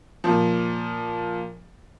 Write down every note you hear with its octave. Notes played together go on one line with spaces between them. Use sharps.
A#2 F3